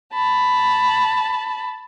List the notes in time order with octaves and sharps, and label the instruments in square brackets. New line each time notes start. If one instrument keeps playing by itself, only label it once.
[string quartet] A5 B5